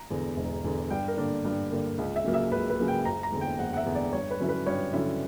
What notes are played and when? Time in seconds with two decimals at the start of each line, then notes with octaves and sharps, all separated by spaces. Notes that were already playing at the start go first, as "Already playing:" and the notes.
Already playing: A#5
0.10 E2 D3
0.37 E1
0.64 E2 D3
0.90 G2 G5
1.08 A#4
1.17 D3 A#3 D4
1.45 G2
1.71 D3 A#3 D4
1.98 C#2
2.16 E5
2.24 C#3 F#3 A#3
2.34 E5
2.51 C#2 B4
2.70 B4
2.79 C#3 F#3 A#3
2.88 G5
3.05 F#1 A#5
3.23 A#5
3.32 E2 D3
3.41 G5
3.59 F#1 F#5
3.73 F#5
3.77 E5
3.86 E2 D3
3.95 D5
4.13 G2 C#5
4.31 B4
4.39 D3 F#3 C#4 E4
4.49 B4
4.66 G2 C#5
4.93 D3 F#3 C#4 E4 E5